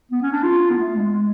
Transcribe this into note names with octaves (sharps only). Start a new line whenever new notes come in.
B3
C#4
D4
F4
B3
A3
G#3